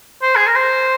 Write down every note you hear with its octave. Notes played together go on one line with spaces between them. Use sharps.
C5
G#4
A#4
C5